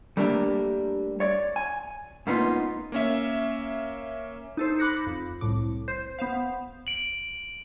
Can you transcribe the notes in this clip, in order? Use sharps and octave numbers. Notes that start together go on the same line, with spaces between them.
G3 A3 A#3 D4 G4 A#4
C#5 D5
G#5
G#2 A#3 B3 C#4 D#4 F4
A#3 C#4 E5
D#4 A4 C5
B5 D6 F#6 A#6 C#7
F2
C2 A2 D6
C5
B3 C5 F5
D7 F#7